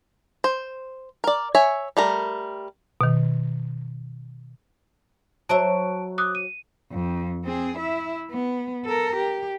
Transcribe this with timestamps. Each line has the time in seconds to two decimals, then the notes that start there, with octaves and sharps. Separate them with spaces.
0.44 C5
1.24 A#4 D5
1.55 C#5 E5 G#5
1.97 G3 A3 A#4
3.01 B2 D#3
5.49 F#3 C5 E5 A5 D7
6.18 D6 D#6 F#6
6.35 D#7
6.91 F2
7.44 C4 G#4
7.77 E4 E5
8.31 B3
8.85 A4 A#4
9.16 G4